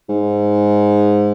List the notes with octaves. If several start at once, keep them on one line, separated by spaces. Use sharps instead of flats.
G#2